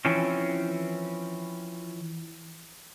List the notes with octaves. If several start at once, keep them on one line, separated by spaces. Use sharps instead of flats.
E3 F3 C4 C#4